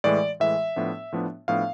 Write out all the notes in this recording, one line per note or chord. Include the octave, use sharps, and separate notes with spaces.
A2 E3 G#3 D5
A2 E3 G#3 E5
A2 F3 B3 D4
A2 F3 B3 D4
A2 F3 B3 D4 F5